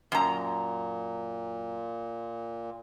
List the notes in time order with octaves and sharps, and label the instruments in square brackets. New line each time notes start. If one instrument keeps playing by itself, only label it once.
[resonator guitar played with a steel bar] F#2 A#5 [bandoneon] A#2